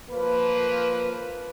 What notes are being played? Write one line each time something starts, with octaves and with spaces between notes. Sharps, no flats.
F3 A#3 B4